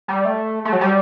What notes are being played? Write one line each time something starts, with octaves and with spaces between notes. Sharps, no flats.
G3
A3
A3
F#3
G3